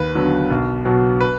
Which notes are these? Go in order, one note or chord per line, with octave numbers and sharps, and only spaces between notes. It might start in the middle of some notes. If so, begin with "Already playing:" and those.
Already playing: D#2 B4
D3 F#3 B3
B1
B2 F#3 B3
B4